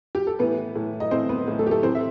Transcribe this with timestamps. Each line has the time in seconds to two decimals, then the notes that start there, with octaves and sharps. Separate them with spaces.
0.15 G4
0.27 A4
0.39 A2 E3 B3 B4
0.75 A2 E3
1.00 D#5
1.11 A2 E3 C4 C5
1.29 B3 B4
1.48 A2 E3
1.59 A3 A4
1.67 G4
1.71 A3 A4
1.83 A2 E3 C4 C5
1.95 E5